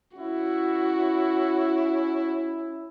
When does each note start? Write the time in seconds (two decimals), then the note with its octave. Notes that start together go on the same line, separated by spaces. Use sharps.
0.17 C#4 E4 F#4